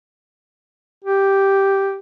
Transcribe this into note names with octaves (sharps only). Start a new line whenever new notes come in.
G4